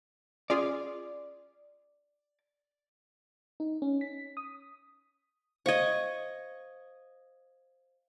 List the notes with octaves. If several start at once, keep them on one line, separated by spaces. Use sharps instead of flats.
C#4 F4 G#4 D5
D#4
C#4
B6
D#6
C5 D#5 F5 C#6 G#6